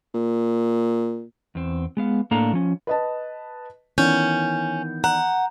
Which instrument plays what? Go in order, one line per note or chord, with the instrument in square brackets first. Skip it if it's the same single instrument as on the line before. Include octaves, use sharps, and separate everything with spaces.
[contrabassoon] A#2
[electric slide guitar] E2 C4
G#3 B3 F5
A2 A#3 D4 A4 F5 A#5
F3 C#4
[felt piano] B4 D#5 A5
[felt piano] D#3 E3 B3 [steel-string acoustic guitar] C#4 [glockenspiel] G6
[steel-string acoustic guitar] F#5 [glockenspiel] A#5